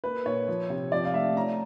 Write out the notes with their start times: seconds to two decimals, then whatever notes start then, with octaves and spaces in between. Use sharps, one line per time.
0.04 A#3 B4
0.26 A#2 C#5
0.48 F3
0.70 C3
0.92 F3 D5
1.05 F5
1.14 A3 E5
1.36 C#4 A#5